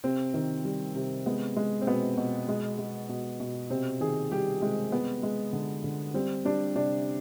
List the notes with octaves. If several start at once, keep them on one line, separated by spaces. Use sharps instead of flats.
C3 C4
D#3
G3
C3
G#3 B3
G#3
C4
B2 B3
B2
G#3
G#3
B2
B2
C3 C4
D#3 G#4
G3 G4
C3 G#3
G#3 B3
G#3
D3
D3
G3 C4
G3 D4
C3 D4